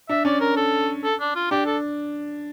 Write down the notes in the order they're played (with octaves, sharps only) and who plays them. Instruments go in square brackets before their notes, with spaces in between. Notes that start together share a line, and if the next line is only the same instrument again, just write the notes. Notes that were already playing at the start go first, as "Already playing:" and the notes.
[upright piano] D4 [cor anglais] E5
[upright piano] C#4 [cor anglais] D5
[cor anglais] A#4
A4
A4
D4
F4
[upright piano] D4 [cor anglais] G4
[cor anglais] A4